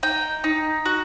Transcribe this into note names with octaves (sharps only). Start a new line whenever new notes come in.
D#4 G5
D#4
F#4